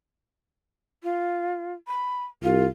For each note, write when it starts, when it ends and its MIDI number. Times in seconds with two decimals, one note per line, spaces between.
1.03 1.73 65
1.87 2.26 83
2.43 2.66 36
2.43 2.65 65